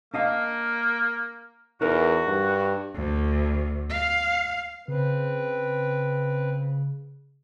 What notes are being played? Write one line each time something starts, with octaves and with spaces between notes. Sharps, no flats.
A#3 D4 D#5 F5
E2 D#4 F#4 A#4 B4
G2
D2
F5
C#3 C4 B4